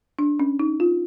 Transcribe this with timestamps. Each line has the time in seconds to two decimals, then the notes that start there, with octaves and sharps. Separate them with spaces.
0.19 D4
0.40 C#4
0.60 D#4
0.80 F4